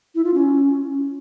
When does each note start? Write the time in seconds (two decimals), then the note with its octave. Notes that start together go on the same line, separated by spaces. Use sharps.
0.15 E4
0.25 F4
0.34 C#4